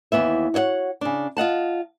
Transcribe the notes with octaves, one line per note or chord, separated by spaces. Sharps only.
D#2 E3 B3 E5
F#4 C#5 D#5 F#5
C#3 D4
F4 D#5 F#5 A5